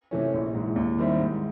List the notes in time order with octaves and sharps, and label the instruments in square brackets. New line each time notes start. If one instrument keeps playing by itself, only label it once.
[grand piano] C3 E3 A3 C#4
A#1
G#2 E3
D#2
D#3 G3 C4 E4
G#2